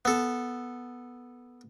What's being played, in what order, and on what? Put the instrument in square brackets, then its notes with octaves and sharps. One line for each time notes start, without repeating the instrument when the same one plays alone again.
[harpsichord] B3 A4